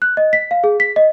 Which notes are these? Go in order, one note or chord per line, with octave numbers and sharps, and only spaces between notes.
F#6
D#5
B6
F5
G#4
B6
D#5